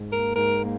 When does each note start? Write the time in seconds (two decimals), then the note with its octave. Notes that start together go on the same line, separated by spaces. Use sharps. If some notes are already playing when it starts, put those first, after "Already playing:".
Already playing: G#2
0.09 A#3 A#4
0.35 G#2 A#4
0.62 A#3